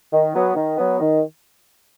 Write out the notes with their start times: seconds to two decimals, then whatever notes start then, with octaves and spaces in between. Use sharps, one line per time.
0.12 D#3
0.34 F#3 B3
0.55 D#3
0.78 F#3 B3
0.99 D#3